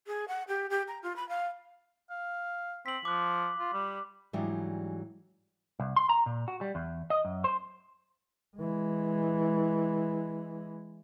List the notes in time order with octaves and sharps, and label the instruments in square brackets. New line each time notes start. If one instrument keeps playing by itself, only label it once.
[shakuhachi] G#4
F#5
G4
G4
A#5
F4
B5
F5
[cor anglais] F5
[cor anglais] C4 [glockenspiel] B6 F#7
[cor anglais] F3 [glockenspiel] D6 F#6
[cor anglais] F4
G3
[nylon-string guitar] G#2 E3 F#3 G3 D4 G4
[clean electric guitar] C2
C6
A#5
A#2
F#4
G3
E2
D#5
F#2
C5
[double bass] E3 G#3